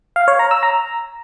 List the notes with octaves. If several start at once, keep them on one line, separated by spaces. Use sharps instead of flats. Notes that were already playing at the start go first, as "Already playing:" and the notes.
F5
C#5
A#5
E6
A#5